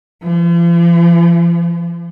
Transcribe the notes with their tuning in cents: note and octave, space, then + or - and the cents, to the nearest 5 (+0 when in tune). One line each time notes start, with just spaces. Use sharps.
F3 -40